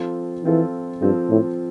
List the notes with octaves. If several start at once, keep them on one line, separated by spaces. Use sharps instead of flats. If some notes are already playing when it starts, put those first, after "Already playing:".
Already playing: F3 C4 F4 A4
E3 F3 C4 F4 A4
G2 F3 C4 F4 A4
A2